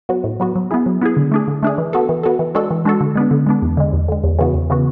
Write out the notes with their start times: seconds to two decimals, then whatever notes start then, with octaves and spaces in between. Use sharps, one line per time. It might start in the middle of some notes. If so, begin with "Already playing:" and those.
0.09 F#3 B3 F#4
0.24 A2
0.40 F#3 B3 F#4
0.56 F#3
0.71 B3 E4 G#4
0.86 F#3
1.01 B3 E4 G#4
1.17 D3
1.32 A3 D4 G#4
1.48 D3
1.63 A3 D4 G#4
1.78 E3
1.93 B3 F#4 A4
2.09 E3
2.23 B3 F#4 A4
2.39 E3
2.55 G#3 D4 F#4 A4
2.71 E3
2.85 G#3 D4 F#4 A4
3.01 D3
3.15 G#3 B3 D4
3.31 D3
3.47 G#3 B3 D4
3.62 E2
3.77 D3 G#3
3.93 E2
4.08 D3 G#3
4.24 E2
4.39 C#3 E3 B3 F#4
4.54 E2
4.70 C#3 E3 B3 F#4